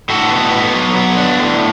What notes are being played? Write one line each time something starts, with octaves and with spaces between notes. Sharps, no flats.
A2 F#4 A4
B3
B3
F#3
B3
D4
A2